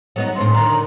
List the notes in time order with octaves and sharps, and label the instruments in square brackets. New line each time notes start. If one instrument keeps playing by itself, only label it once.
[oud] F#3 B3 D#4
[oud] D2 A2 [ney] C6
[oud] D3 D#3 [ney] A#5